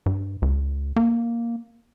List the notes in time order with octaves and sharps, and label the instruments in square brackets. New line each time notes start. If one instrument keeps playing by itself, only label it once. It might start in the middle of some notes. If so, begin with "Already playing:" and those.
[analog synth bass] G2
C#2
A#3